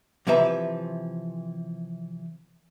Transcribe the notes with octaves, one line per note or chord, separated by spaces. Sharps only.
C3 E3 F3 B4 E5 A#5